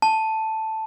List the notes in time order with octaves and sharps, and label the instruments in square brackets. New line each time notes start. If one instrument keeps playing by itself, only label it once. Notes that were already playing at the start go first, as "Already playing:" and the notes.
[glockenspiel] A5